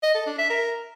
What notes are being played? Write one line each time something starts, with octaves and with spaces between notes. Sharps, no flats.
D#5
A4
D4
E5
A#4